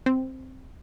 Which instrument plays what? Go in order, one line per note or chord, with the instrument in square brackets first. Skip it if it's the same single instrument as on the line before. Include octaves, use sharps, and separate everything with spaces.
[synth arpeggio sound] C4